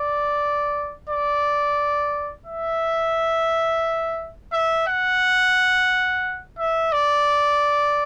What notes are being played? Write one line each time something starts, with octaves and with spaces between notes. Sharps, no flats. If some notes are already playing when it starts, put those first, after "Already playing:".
Already playing: D5
D5
E5
E5
F#5
E5
D5